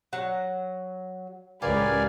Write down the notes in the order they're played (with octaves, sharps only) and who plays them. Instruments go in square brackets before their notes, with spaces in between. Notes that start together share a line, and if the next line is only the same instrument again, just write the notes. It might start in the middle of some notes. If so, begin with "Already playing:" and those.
[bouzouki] F#3 F#5
[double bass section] C#2 A2 [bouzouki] G4 [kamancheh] A#4 B4 [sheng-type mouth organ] D5 F5 G#5